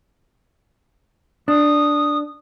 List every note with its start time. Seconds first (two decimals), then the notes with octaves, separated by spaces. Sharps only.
1.48 D4 D#6